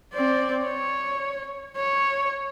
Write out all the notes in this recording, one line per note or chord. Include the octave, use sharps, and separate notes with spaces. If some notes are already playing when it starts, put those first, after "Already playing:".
C4 D5
C#5
C#5